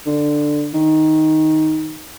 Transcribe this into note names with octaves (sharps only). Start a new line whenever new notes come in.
D3
D#3